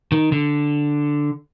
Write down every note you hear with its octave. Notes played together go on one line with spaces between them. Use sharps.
D#3
D3